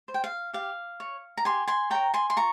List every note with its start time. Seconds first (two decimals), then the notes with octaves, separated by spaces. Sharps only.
0.08 C5
0.14 G5
0.24 F5
0.53 G4 F5
1.00 C#5
1.37 A#5
1.45 G4 G#5 C6
1.67 G#5 C6
1.90 A#4 C#5 G5 A#5
2.14 G#5 C6
2.30 C6
2.36 F4 A#5 C#6